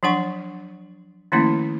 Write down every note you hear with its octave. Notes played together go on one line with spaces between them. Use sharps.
F3 F#3 D4 F#5 C#6
D#3 F3 A3 A#3 C#4 E4